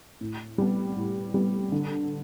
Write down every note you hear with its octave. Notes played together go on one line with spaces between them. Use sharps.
A2
G3 B3
A2
G3 B3
D3